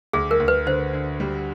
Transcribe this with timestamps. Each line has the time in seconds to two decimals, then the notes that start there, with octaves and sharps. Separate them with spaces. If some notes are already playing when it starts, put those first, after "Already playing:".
0.13 D2 G#4
0.31 A#4
0.40 D2
0.48 B4
0.66 D3 C5
0.93 D3
1.20 G3